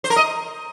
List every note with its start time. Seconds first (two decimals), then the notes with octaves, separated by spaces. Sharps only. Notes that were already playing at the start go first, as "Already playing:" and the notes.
0.04 C5
0.10 A#4
0.16 D#5